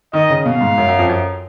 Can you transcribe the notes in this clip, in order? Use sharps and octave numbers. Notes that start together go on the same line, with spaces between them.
D#3 D#5
C#3
B2 F5
G#2
F#2
F#2
F2
F#2